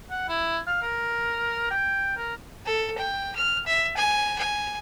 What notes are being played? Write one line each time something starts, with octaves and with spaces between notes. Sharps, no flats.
F#5
E4
F5
A#4
G5
A#4
A4
G5
F6
E5
G#5
G#5